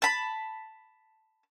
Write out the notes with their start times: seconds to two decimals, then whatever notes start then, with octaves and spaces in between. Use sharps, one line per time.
0.02 A5 B5